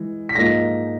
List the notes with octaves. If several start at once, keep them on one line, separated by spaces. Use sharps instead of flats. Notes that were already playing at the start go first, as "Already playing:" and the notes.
Already playing: E3 G#3
B6
G#2 F3 A#3 D#4 A#6